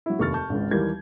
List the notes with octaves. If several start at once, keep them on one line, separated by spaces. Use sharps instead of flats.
F#3 E4
F1 D#2 C#6 F6 A6
A5 C#6 G6
G#1 C#2
D#2 E3 G3 A#3 G6 G#6